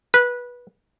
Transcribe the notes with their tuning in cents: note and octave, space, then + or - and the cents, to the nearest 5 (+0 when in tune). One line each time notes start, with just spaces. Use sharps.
B4 -20